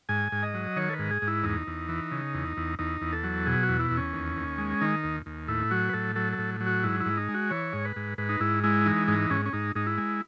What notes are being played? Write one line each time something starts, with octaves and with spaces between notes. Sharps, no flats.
G#2 G#5
G#2
D#5
F#3
D#3 C#5
A4
B4
G#2
G#4
G#2
E4
E2 D#4
E2
E3
C#3
E2
E2
E2 D#4
E2
A4
F#3
B2 G#4
F#4
E2
E4
E2
C#4
D#2
D#2
G#3
D#3 D#4
D#2
D#2
A2 E4
F#3 F#4
B4
A2 A4
F#3 A4
A4
A2
F#3
F#4
G#2 E4
E4
G#2
D#4
G#3
F#4
E3 C#5
G#2
B4
G#2
G#2 B4
D#4
G#2 E4
G#3 E4
E3 D#4
G#2 D#4
G#2 C#4
C#4
G#2 D#4
G#2 D#4
E4
G#3